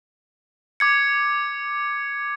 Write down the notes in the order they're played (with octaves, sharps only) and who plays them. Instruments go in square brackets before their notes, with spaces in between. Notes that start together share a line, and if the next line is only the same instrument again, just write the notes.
[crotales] D6 G#6 C#7